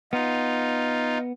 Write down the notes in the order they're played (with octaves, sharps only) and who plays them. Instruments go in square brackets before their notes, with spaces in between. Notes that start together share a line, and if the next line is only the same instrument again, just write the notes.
[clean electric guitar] B3 [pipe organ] D#4 F4